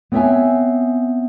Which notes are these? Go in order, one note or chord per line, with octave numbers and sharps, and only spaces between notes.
B3 C4 C#5 D#5 E5 G#5